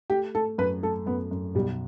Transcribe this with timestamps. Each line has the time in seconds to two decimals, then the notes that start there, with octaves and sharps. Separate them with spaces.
0.10 A3 G4
0.35 A3 A4
0.58 F#2 B4
0.83 A3 A4
1.06 F#2 B3
1.31 F#2
1.55 B1 G3